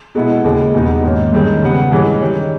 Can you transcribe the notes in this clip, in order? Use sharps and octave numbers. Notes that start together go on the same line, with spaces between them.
B2 G#3 B3 E4
D#2 C#3 G#3
E2 B2 G3 B3 D#4
G#2 D#3 A#3 C#4
G2 D#3 G#3 C#4
C#3 G3 B3
G2 E3 G#3 C#4 G#4
D#3 G3 C#4